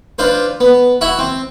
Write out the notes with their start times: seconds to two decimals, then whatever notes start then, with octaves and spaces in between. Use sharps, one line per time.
0.19 D4 F4 B4 C5
0.60 B3
1.01 E4 F#4 E5 F#5
1.19 C4